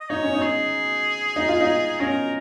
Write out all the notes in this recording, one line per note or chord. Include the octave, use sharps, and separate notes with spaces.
D#5
D#4 C#5
C#4
D#4
G#4
D#4
F4
D#4
C#4 A#4